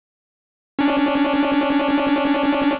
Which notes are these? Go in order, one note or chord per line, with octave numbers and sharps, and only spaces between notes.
C#4 D4